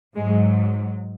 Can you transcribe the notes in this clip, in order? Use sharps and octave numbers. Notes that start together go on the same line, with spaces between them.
G#2 F#3 G#3